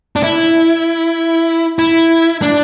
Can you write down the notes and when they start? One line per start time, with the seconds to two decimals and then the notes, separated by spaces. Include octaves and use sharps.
0.16 D4
0.23 E4
1.79 E4
2.42 D4